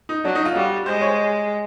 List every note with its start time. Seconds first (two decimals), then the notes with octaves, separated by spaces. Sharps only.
0.09 D#4
0.25 F#3 D4
0.35 D#4
0.45 F4
0.55 G3 F#4
0.86 G#3 C5
1.01 C#5